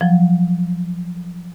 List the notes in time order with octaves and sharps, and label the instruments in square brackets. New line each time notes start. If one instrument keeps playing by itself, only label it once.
[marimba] F3 F#3